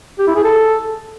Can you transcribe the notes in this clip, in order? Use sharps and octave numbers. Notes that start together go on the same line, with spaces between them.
G4
E4
G#4
A4